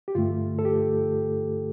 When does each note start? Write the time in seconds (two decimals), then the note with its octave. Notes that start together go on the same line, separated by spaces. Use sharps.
0.08 G4
0.15 G2 D3 A3 F4
0.59 A4
0.65 G4